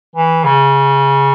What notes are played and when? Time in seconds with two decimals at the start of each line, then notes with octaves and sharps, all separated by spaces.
0.16 E3
0.44 C#3